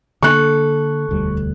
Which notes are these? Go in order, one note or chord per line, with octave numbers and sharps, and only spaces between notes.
D3 A#3 D4 A4 C#6 F#6
E1 D2 G3